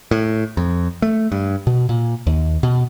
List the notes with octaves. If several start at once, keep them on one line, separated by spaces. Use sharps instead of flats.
A2
F2
A3
G2
B2
A#2
D#2
B2